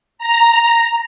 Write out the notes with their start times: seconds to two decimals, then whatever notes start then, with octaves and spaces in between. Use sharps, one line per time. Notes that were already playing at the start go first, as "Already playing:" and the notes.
0.18 A#5